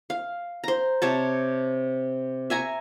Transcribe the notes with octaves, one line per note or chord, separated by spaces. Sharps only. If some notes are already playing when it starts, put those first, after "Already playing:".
F5
C5 A#5
C3 C#5 A5
E5 G#5 A#5 C#6